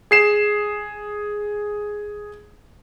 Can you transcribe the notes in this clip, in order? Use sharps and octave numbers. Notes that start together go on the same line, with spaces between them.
G#4 C7 E7